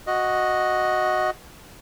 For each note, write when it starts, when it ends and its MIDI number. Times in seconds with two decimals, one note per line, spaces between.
0.07 1.30 66
0.07 1.30 75